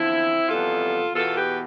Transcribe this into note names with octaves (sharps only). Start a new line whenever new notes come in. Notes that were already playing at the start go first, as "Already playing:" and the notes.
Already playing: E2 D3 F3 C4 E4
F2 C3 E3 G3 B3 F4 A4
E2 B2 B3 F4 A4
G4 B4